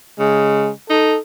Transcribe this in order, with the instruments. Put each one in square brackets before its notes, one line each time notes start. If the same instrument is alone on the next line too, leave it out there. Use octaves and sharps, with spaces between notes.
[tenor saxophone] C#3 [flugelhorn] G#3
[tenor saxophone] D#4 [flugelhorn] A4